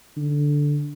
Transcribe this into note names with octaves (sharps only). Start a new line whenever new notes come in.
D3